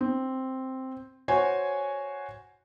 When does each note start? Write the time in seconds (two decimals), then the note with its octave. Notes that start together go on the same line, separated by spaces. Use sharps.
0.01 C4
1.28 F#4 C5 C#5 G#5 C#6